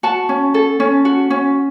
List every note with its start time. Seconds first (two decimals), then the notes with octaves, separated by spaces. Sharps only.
0.03 F#4 A5
0.29 C#4
0.54 A4
0.80 C#4
1.05 F#4
1.30 C#4